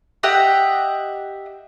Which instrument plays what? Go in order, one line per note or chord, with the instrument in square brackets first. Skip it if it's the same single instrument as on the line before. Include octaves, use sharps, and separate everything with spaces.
[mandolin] G4 D#5 E5 F#5